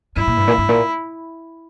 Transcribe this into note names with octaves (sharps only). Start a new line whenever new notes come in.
G2 E4
A#2
G2
A#2
G2
A#2